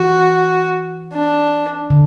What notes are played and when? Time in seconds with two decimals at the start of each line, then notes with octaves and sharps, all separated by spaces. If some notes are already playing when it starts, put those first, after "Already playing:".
Already playing: E3 F#4
1.13 D4
1.90 D3